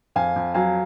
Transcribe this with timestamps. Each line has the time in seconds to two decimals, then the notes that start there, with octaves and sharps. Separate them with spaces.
0.16 F2 F5 G#5
0.36 F2
0.54 F#3 F5 G#5